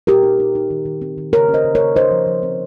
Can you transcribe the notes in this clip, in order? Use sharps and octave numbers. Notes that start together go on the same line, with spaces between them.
A#2 G4 A#4
D#4
D#4
D#4
D#3
D#3
C4
D#3
C#3 A#4 C#5
C#4
C5 D#5
C#3
A#4 C#5
C#3
D#4 C5 D#5
F3
F3
C4